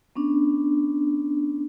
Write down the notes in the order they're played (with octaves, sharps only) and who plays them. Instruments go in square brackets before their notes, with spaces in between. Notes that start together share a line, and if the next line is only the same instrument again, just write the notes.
[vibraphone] B3 C#4 D4